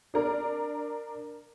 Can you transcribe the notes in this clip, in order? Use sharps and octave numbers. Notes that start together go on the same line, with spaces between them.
D4 A#4 D5